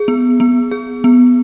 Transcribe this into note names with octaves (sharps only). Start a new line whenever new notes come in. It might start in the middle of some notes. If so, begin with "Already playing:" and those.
Already playing: G#4
B3
B3
G#4
B3